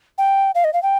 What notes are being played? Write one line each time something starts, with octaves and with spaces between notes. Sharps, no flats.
G5
F5
D#5
F5
G5